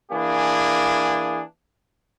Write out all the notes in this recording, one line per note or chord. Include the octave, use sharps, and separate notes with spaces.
E3 A#3 D4 G#4